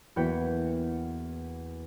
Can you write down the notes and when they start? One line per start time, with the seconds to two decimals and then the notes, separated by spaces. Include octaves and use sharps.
0.16 E2 A#3 B3 F#4 G5 B6